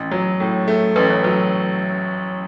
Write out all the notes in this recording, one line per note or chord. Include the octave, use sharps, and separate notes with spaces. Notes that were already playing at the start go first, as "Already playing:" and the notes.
Already playing: A1
F#3
A2
A3
A1 B4
C#5
F#3 B4